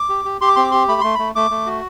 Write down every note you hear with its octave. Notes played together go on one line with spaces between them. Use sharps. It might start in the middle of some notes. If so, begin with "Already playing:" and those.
Already playing: D6
G4
G4
G4 C6
D6
C4 C6
D6
G4 C6
A3 B5
A3 C6
A3 B5
A3 D6
A3
F#4